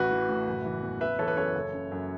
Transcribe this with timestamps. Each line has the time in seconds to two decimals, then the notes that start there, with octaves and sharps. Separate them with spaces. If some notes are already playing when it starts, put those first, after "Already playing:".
Already playing: A1 F#4 B4
0.11 E3
0.29 A2
0.47 F#1
0.65 E3
0.82 E2
1.01 F#1 B4 E5
1.18 E3 A4 C#5
1.28 B4
1.37 F#2 A4 C#5
1.55 F#1
1.73 C#3
1.91 F#2